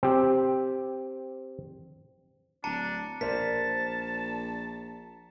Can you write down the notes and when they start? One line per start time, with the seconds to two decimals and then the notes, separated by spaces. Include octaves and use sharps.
0.03 C4 G4
2.64 D1 D4 A5 A#5 C#7
3.21 A#1 A#4 C5 D5 A5 B6